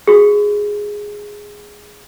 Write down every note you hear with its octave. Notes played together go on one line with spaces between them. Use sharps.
F#4 G#4